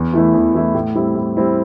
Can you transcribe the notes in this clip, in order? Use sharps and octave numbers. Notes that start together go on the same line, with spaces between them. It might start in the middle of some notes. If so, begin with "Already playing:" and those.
Already playing: E2
E3 A3 E4
E2
E3 A3 E4
A2
G3 C4 E4
A2
G3 C4 E4